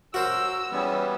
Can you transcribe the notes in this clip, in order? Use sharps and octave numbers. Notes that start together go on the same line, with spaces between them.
F#2 F#4 A#4 C5 E6
E3 G3 G#3 B3 C#4